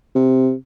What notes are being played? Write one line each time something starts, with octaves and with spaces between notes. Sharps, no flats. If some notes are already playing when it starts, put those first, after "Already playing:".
C3